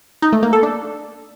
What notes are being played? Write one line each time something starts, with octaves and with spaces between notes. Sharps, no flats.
D#4
A3
A#3
A4
D4